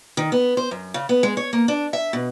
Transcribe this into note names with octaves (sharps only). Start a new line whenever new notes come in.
D#3
B3
C5
F#2
C#3
B3
G#3
C#5
A#3
D4
E5
B2